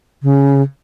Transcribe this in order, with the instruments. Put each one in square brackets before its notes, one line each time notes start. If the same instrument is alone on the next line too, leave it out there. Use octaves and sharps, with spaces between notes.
[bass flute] C#3